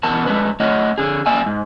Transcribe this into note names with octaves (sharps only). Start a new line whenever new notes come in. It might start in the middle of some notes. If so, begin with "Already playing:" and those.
E2 B2 A#4 F#5 A5
G#3 A3 D4 B4
A3 C#5 D#5 F#5
D3 G#4
A#3 D5 E5 G5 G#5
G#2